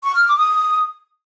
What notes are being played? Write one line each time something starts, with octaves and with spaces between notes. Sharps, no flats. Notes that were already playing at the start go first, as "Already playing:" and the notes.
C#6
F6
D6
D#6